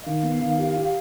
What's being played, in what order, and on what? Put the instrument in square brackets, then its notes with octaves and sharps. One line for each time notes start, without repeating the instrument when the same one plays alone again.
[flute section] D#5
[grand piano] D#3 [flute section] F5
[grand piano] B3
D#3
G4
G4